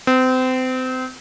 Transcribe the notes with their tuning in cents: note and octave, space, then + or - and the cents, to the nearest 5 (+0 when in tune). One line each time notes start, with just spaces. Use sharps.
C4 -30